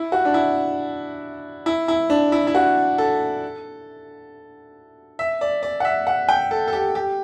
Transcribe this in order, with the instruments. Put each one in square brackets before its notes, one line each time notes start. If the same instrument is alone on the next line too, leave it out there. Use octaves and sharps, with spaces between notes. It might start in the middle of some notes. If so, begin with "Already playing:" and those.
Already playing: [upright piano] E4
F#4
D4
E4
E4
E4
D4
E4
E4
F#4
A4
E5
D5
D5
F#5
E5
F#5
G5
A4
A4
G4
G4